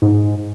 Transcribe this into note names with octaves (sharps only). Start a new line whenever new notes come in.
G#2